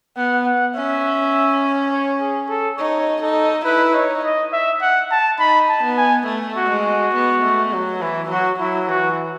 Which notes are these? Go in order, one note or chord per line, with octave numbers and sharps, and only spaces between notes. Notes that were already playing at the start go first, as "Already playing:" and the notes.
B3 F#5
F#5
C#4 E5
C#5
G#4
A4
D#4 C#5
D#4 A4
E4 B4
D#4 C#5
D#5
E5
F#5
A5
D#4 B5
A5
B3
G#5
A3
F#4
G#3
F#4
B3
A3
F#3
E3 E4
F#3 F#4
F#3 E4
E3 F#4